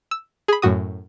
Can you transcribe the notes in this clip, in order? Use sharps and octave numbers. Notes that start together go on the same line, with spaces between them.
E6
G#4 B5
F#2 A2 F#4 D#6